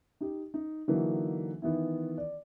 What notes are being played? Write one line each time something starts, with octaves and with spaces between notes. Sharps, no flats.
D#4 G4
D#4
D3 E3 F#3 A#3 D#4
D#3 E3 B3 E4
D5